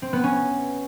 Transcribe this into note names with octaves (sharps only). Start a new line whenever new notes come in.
C4
B3
C#4